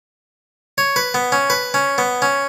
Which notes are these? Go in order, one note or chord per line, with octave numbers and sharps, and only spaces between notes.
C#5
B4
B3
C#4
B4
C#4
B3
C#4